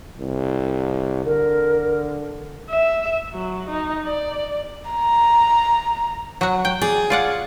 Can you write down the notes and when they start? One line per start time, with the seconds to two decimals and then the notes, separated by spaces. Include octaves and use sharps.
0.20 C2
1.25 D3 A#4
2.70 E5
3.34 F#3
3.69 D#4
4.06 D5
4.91 A#5
6.41 F#3 F#4
6.65 G5
6.82 G#4 D5
7.10 F4 D5 F#5